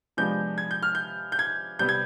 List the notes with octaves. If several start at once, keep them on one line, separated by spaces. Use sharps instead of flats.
C3 F3 G#3 B3 D4 G6
G#6
G6
F6
G6
G6
G#6
C3 G3 B3 G6
G#6